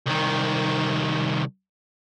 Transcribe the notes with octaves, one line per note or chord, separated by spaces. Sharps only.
C2 D#3